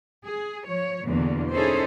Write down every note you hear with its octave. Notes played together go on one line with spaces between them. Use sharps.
G#4
F3 C#5
E2 B2 D3 A#3
C#4 D#4 E4 G#4 A4 C5